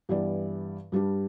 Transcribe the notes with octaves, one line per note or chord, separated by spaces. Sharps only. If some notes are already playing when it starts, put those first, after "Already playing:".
G2 E3 B3 G4 D5
G2 G3 D4 G4